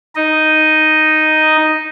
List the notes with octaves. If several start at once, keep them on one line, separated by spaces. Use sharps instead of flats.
D#4 D#5